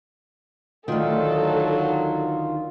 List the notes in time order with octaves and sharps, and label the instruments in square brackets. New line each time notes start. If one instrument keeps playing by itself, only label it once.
[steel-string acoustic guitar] D2 D#3 [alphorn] F#3 [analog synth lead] F4 [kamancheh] A4